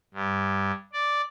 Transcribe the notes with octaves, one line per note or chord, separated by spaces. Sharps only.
G2
D5